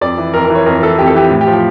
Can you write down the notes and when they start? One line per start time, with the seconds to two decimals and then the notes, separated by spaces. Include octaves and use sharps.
0.01 F2 D5
0.18 E3
0.34 F2 A#4
0.45 A#4
0.50 E3
0.55 C#5
0.66 F2 A#4
0.82 E3 A4
0.98 F2 G4
1.07 A4
1.14 E3 G4
1.31 A2
1.41 G4
1.47 F3
1.53 G4